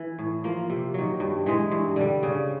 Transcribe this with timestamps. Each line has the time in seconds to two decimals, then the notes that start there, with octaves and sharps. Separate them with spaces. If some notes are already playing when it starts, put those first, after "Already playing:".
Already playing: E3
0.19 A2
0.44 F3 A#3
0.70 C3
0.94 D#3 F#3
1.20 G2
1.46 E3 G#3
1.71 G2
1.96 D3 G3
2.23 C#3